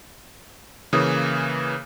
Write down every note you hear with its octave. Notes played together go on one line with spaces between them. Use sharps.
C#3 E3 A#3 D#6